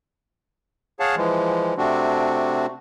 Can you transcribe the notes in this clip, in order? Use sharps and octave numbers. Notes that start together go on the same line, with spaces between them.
G#4 C#5 F5 F#5 A5
E3 F3 G#3
C3 A3 C4 D4 F#4